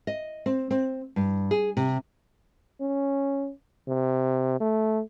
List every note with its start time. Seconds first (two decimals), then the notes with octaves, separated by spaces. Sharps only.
0.07 D#5
0.46 C4
0.71 C4
1.16 G2
1.51 G#4
1.77 C3
2.81 C#4
3.88 C3
4.60 A3